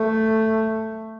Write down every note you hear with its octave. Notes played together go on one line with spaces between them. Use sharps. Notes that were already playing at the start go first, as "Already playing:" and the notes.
Already playing: A3